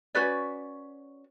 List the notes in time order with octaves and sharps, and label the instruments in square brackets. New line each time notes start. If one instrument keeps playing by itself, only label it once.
[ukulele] C#4 F#4 B4 D5